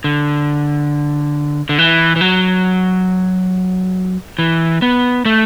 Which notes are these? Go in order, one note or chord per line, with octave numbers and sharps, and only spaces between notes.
D3
D3
E3
E3
F#3
E3
B3
A3